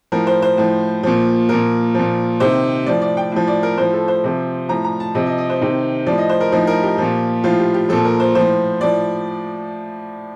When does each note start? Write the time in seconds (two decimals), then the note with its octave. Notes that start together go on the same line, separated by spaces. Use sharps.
0.12 A2 F3 A#4
0.27 C5
0.42 C5
0.58 A2 F3
1.03 A#2 F3
1.49 A#2 F3 A#4
1.94 A#2 F3
2.40 C3 D#3 C5
2.86 A2 F3 D5
3.01 D5
3.17 G5
3.32 A2 F3
3.47 D5
3.63 A#4
3.77 A2 F3 C5
3.93 A4
4.08 C5
4.24 C3 F3
4.69 A2 F3 A#5
4.84 A#5
5.00 A5
5.15 C3 F3 D#5
5.27 D#5
5.38 D#5
5.50 C5
5.61 C3 D#3
6.06 A2 F3 D5
6.18 D#5
6.29 C5
6.41 A#4
6.52 A2 F3 D#4
6.67 A#4
6.83 G4
6.98 A#2 F3
7.44 A2 F3 F4
7.59 G4
7.74 G4
7.89 A#2 F3 A4
8.05 A#4
8.20 C5
8.35 A2 F3 C5
8.81 A2 F3 D5